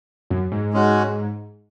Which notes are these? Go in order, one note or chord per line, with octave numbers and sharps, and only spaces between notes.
F#2
G#2
G#3 C#4 F#4